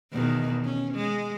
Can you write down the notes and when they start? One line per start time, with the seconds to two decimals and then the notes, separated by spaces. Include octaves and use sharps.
0.12 E2 B2 D#3
0.64 C#4
0.94 G#3